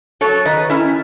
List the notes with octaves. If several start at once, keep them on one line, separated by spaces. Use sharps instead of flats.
F#3 A4 C#5
D#3 B4 D#5
D#3 C#4 E4